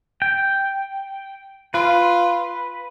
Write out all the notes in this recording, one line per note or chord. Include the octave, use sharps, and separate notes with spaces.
G5
F4 B4